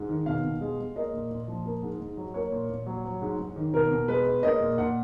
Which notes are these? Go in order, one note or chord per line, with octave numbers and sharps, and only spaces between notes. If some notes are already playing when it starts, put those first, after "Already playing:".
Already playing: G#2
D#3
B2 F5
B2
G#3
G#3
A#3 D#5
A#2
A#2
F3
A#3
G#2
G#2
F#3
A#3 C#5
A#2
A#2
F#3
F#3
G#2
G#2
D#3
B2 A#4
B2
G#3 B4
G#3
A#3 D#5
A#2
A#2 F#5